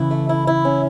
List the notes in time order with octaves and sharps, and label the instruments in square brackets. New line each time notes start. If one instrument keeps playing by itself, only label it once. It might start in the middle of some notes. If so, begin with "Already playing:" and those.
Already playing: [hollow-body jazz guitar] C#3 E3 [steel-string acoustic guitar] E4
[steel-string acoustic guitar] A3
E4
E4
C#4